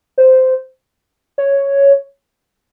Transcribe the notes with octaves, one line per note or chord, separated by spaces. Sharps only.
C5
C#5